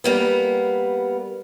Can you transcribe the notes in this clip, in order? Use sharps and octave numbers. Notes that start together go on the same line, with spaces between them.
G3 A#3 B3